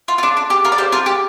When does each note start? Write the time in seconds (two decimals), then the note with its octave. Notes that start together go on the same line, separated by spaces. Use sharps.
0.08 F4
0.18 F4
0.23 D4
0.37 D4
0.50 G4
0.65 F4 A#4
0.72 D5
0.78 G4 C5
0.92 F4 A#4
1.06 G4